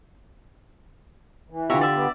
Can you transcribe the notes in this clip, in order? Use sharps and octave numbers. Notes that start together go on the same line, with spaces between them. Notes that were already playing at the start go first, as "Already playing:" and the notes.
E3
D3 F4 G4 C#5 E5 A#5
D5 E5
B3